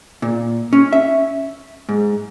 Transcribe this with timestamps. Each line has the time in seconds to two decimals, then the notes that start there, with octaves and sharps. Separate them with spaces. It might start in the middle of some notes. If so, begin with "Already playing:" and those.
0.22 A#2
0.73 C#4
0.93 E5
1.89 G#2